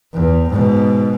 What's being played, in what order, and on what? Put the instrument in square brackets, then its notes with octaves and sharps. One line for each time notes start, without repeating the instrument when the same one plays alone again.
[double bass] E2
G#2 B2